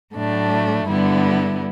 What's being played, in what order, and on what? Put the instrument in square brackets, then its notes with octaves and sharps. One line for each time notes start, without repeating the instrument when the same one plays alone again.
[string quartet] A2 F#3 A3 D4
G2 D3 G3 B3 E4